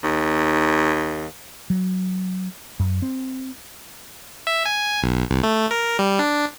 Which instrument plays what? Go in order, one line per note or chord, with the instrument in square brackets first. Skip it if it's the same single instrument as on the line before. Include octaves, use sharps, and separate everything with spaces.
[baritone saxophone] D#2
[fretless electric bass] F#3
F#2
C4
[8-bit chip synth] E5
G#5
B1
C2
A3
A#4
G3
D4